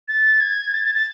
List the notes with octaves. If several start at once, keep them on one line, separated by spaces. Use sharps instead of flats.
A6
G#6
A6
A6
A6